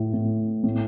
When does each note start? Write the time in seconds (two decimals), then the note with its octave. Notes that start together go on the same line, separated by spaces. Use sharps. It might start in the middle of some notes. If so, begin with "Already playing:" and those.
Already playing: A2
0.13 A2
0.64 A2